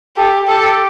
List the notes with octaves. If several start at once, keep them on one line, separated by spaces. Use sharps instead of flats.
G4 A4
G4 A4